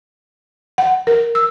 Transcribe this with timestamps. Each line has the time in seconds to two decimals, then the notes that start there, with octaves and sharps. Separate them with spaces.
0.78 F#5
1.07 A#4
1.35 E6